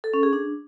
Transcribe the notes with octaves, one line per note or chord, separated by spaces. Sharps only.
A4
C#4
G#4
D4